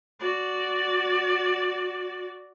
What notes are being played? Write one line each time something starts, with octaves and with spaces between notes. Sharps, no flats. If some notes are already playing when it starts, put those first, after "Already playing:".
F#4 D5